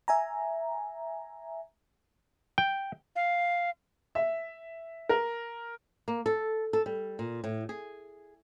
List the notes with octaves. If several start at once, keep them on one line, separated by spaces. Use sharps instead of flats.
E5 G#5 A#5
G5
F5
E5
A#4
A#3
A4
A4
G3
A#2
A2
G#4